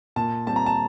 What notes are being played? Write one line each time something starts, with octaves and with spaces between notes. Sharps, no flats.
A#2 A5
G3 C4 A5
A#5
A5